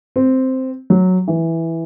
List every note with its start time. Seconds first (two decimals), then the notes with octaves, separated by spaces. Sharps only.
0.16 C4
0.90 F#3
1.28 E3